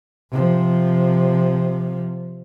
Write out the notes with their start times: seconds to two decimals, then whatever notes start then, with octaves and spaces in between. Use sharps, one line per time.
0.32 C3 F3